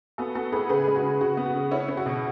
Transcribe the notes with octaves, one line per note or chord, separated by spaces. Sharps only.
B3 F#4 A4
B3 F#4 A4
A2 G#4 B4
C#3 G#4 B4
G#3 G#4
F#4
C#3
C#3 F#4
B3
F#4
C#3
C#4 E4
C#4
F#4
B2